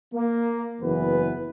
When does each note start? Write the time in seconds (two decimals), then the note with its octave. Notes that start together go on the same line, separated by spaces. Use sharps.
0.14 A#3
0.81 F#1 E2 E3 B3 B4